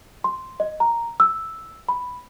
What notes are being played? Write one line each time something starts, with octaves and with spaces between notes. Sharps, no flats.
C6
D#5
A#5
E6
B5